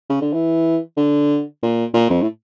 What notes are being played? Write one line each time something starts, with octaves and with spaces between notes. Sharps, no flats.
C#3
D3
E3
D3
A#2
A#2
F2
A2